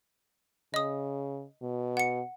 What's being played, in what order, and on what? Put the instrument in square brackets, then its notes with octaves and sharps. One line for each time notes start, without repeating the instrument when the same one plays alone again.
[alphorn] C#3 [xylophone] D#5 D#6
[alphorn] B2
[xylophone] F#5 C#7